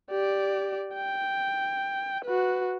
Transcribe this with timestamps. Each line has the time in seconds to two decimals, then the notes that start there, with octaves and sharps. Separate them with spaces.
0.10 G4 D5
0.95 G5
2.25 F#4 B4